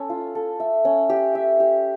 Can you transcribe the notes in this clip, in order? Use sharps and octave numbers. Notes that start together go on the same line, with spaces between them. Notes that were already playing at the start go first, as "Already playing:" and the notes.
Already playing: C#4 A4
F4
A4
E5
C#4
G4
E5
G4